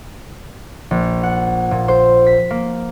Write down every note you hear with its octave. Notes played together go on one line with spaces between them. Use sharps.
A#1
F#5
A#2
C5
B6
A#3